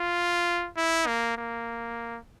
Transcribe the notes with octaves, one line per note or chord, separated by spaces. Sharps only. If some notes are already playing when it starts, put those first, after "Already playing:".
Already playing: F4
E4
A#3
A#3